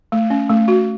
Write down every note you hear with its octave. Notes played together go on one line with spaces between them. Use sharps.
A3
C#4
A3
F#4